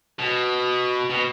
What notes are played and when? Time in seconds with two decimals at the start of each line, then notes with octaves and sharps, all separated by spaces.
0.19 B2
1.10 B2